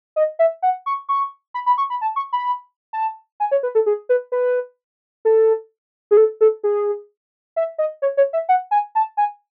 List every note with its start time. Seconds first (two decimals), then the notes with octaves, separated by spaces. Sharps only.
0.16 D#5
0.39 E5
0.62 F#5
0.86 C#6
1.09 C#6
1.54 B5
1.66 B5
1.78 C#6
1.90 B5
2.01 A5
2.16 C#6
2.33 B5
2.93 A5
3.40 G#5
3.51 C#5
3.63 B4
3.75 A4
3.86 G#4
4.09 B4
4.32 B4
5.25 A4
6.11 G#4
6.17 A4
6.41 A4
6.64 G#4
7.56 E5
7.78 D#5
8.02 C#5
8.17 C#5
8.33 E5
8.49 F#5
8.71 G#5
8.95 A5
9.17 G#5